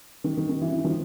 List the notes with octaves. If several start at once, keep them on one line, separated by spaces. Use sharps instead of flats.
D#3
D#3
D#3
E3
E3
D#3 F3